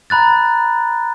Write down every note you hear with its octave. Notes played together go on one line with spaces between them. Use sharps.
A#5 B5 F#6 A6